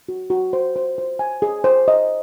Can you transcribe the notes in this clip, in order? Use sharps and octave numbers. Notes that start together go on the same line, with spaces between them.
F#4
F#4
C5
C5
C5
G#5
G#4
C5
D#5